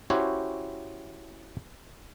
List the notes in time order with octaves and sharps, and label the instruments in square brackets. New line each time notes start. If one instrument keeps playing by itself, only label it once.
[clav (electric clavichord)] C#4 E4 F#4 G4 C5 C#5